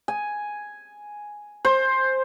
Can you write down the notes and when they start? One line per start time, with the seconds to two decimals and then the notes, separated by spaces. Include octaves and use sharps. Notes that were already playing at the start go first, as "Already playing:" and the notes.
0.08 G#5
1.65 C5